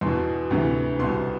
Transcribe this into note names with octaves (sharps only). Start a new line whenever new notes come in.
E2 B2 C6
D2 C3 E3
C2 B2 C6